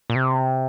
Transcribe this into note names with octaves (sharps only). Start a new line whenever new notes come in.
A#2
C3